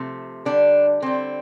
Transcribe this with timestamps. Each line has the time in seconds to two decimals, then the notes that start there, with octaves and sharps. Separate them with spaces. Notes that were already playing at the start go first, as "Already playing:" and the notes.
Already playing: C3 F3 A3
0.45 D3 G3 D4
1.02 D3 G3 C4